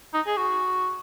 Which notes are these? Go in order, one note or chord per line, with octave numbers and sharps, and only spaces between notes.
D#4
G#4
F#4